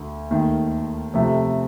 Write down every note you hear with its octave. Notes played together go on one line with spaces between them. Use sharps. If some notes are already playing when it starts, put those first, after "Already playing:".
Already playing: D2 D3
D#2 D#3 A3
F2 C3 F3 A3